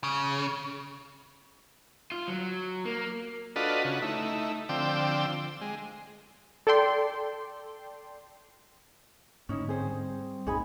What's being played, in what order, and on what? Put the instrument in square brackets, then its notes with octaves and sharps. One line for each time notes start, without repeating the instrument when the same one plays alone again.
[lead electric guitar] C#3
[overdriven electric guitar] F4
F#3
A#3
[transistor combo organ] D4 F4 F#4 A4 B4 D#5
C#3 F#4
A3 D#4 E4
D3 F3 C4 G5 D6 E6
G#3
[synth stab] A4 D5 G5 C6
[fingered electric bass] G#2 D3 [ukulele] C#4 D#4 E4
[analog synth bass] C4 [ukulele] G#4 C5
[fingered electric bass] G3
[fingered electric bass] B1 F#2 A2 [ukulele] D#4 G#4 B5